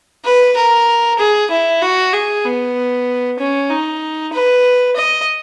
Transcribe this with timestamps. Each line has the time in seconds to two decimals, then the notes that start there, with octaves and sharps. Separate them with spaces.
0.25 B4
0.56 A#4
1.18 G#4
1.50 E4
1.82 F#4
2.13 G#4
2.45 B3
3.39 C#4
3.70 D#4
4.33 B4
4.96 D#5